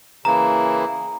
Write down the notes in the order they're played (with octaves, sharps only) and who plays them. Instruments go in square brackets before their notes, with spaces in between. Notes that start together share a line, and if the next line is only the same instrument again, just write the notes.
[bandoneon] C#3 E3 A#3 E4 [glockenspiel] A#5